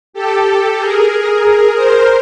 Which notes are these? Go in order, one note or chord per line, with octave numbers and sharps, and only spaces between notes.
G4 A4
G#4 A#4
A#4 C5